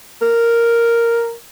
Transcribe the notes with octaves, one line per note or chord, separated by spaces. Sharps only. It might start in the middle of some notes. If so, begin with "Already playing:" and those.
A#4